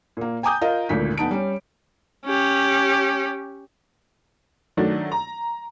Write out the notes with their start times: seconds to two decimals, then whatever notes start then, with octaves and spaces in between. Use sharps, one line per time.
0.17 A#2 A#3
0.43 G5 G#5 A#5 D6 D#6 G6
0.61 F4 A#4 D#5
0.89 G#1 D2 A#2 B6
1.18 F1 B3 D#4 A5 D7
1.31 G3 C#4
2.25 C#4 G4
4.77 D#3 F#3 A3 D4
5.12 A#5